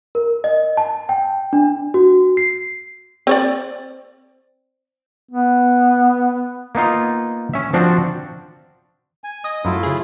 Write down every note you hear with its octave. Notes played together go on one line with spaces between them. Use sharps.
A#4
D#5
A5
G5
D4
F#4
C7
C4 C#5 D5
B3
A#3 B3 D#4 F4
C#4 E5
F3 C4 D4 F#4
G#5
D#5 D#6
F#2 F#3 A3 E4 F4
C#3 G#4